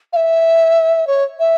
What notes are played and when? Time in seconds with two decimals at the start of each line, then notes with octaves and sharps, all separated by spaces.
0.13 F5
0.16 E5
1.07 C#5
1.39 E5